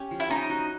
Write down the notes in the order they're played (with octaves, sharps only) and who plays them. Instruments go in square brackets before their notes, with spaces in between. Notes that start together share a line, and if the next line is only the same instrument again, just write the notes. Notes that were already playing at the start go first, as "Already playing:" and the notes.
Already playing: [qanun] C#4 G4
F3
[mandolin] E4
[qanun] C#4 [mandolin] D#4
[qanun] F#4